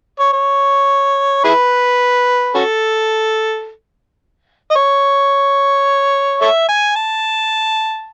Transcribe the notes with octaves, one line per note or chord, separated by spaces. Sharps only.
C#5
C#5
E4 G#4 B4
C#4 F#4 A4
D#5
C#5
A4 C#5 E5
G#5
A5